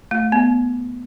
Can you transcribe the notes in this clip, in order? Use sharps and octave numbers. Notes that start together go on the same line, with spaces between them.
A3
B3